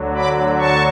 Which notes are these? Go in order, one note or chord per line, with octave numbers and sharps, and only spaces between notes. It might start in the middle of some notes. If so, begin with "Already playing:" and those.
Already playing: D2 D3 F#3
B5 D6
A5 C#6